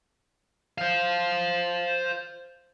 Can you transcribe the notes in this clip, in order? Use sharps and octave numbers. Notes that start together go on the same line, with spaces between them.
C5 F5